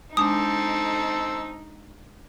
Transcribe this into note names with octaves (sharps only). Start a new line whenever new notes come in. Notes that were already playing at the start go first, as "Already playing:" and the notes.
G#3 C4 D4 D#4 A5 D#6 E6